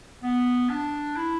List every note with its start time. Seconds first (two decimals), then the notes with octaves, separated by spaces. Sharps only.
0.23 B3
0.69 D4
1.16 E4